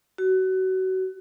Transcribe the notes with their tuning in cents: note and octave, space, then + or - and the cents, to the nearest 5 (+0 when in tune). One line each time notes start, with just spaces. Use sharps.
F#4 +25